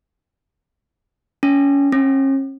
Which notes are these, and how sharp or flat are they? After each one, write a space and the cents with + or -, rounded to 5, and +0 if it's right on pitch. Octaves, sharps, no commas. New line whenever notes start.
C#4 +20
C#4 -40